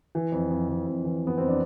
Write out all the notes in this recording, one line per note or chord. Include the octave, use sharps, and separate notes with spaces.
E3
F2
F2
E3
F2
E3
F2 B3
F2 C4
D4